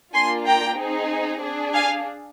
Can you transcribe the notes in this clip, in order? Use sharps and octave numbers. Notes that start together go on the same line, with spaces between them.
A#3 D4 F4 G#5 C6
G5 A#5
C4 D#4 G#4
D4 G#4
F5 G#5